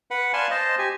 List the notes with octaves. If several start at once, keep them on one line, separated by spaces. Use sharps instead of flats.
B4 F#5
D5 F5 G#5 A5 C6
C5 D#5 A5
G4 G#5